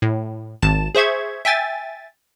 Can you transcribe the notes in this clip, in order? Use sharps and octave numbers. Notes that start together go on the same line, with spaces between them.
A2
G#1 A5 E7
G#4 C5 E5 C#6 G#6
E5 G5 G#5 A6